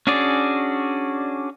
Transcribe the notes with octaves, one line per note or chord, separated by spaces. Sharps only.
C#4 D4 F#4 G#4 D5